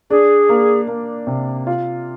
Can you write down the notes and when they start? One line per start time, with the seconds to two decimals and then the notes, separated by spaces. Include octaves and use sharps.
0.10 D4 G#4
0.49 A#3
0.88 A#3
1.27 C3
1.67 F4